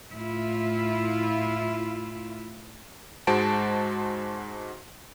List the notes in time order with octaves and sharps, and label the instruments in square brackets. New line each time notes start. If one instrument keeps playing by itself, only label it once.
[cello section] A2 E4 F4
[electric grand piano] G#2 G#3 F#4 C5 A5 D7